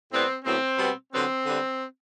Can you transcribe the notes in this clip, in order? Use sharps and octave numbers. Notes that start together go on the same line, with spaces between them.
A2 G3 B3 C4
A2 F#3 B3 C4
B2 G3 B3
D3 F#3 B3 C4
D3 G3 B3